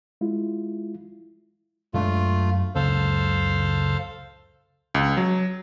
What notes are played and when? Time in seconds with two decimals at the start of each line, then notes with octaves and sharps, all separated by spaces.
0.21 G#3 E4 F4
1.94 F#2 G#3 A3 D4 F4
2.75 C#2 F#2 C#3 A4 C5 F5
4.95 C#2
5.17 F#3